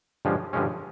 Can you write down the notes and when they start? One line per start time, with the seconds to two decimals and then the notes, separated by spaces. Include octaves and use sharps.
0.25 G2 D3 F3 G#3 C#4
0.53 G2 D3 F3 G#3 C#4